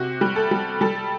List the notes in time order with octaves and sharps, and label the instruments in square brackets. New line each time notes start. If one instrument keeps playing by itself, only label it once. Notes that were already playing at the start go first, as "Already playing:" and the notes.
Already playing: [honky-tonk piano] C3 F#4
G3
A4
G3
G3 A4